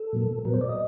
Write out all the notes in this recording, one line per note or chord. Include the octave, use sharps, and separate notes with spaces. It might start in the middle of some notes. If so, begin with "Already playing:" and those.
Already playing: A4
A#2 F#3 A#3
A#2 F#3 B3 A#4
C5
D5
D#5